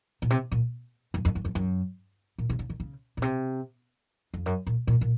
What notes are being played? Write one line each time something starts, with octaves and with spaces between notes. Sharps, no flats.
A#2
C3
A#2
F#2
F2
F#2
F2
F#2
A#2
C3
C#3
D#3
C#3
A#2
C3
F2
F#2
A#2
A#2
A#2